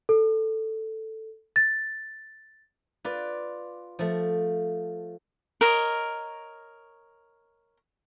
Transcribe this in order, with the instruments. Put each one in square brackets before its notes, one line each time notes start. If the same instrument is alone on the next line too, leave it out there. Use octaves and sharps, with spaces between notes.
[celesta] A4
A6
[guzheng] F4 B4 D5
F3 A3
[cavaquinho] A#4 C#5 D#5